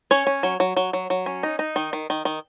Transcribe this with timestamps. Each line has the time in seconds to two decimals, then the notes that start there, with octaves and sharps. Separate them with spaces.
0.11 C#4 C#5
0.27 C#4
0.43 F#3
0.60 F#3
0.77 F#3
0.93 F#3
1.10 F#3
1.26 C#4
1.43 D#4
1.59 D#4
1.76 D#3
1.93 D#3
2.10 D#3
2.25 D#3